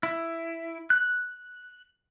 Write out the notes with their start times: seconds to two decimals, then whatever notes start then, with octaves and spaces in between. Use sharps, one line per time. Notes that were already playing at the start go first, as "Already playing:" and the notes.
0.03 E4
0.90 F#6